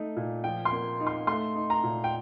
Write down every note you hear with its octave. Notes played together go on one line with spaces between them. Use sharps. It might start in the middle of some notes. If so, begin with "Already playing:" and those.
Already playing: A3 D#4
A#2
F3 G5
C6
A#3
D#4
C6
A3 C6
D#4
A#5
A#2
G5